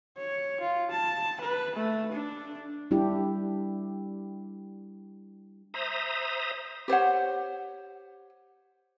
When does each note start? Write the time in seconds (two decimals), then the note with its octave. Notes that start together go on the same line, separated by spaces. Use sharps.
0.18 C#5
0.61 F4
0.91 A5
1.41 B4
1.76 A3
2.12 D4
2.91 G3 D4 E4 G4
5.74 C5 E5 A#5 D#6
6.88 G4 C5 C#5 F#5